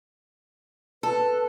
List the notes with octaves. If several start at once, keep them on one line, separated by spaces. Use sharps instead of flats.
A4 B4